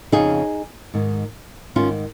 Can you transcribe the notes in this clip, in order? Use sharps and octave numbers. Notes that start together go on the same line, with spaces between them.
F2 C#3 F3 D#4 G#4
G#2 D#3
G#2 D#3 C#4 F4